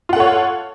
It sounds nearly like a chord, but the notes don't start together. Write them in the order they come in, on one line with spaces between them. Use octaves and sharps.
F4 F#5 A4 C#5